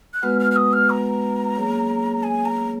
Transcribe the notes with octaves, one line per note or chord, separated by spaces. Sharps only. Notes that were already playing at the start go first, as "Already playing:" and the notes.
F#6
G#3 B3 F#4 B4 F#5 F6
F6
F6
D#6
F6
A#5
F#3 A#3 C#4 G#4 C#5
G#5
A#5